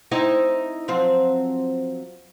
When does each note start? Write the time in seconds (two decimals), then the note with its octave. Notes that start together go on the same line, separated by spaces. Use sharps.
0.11 C4 D#4 E4
0.88 F3 F#3 C4